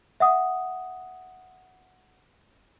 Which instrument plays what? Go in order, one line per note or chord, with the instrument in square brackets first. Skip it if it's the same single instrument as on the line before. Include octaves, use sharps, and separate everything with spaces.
[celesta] E5 F#5 D#6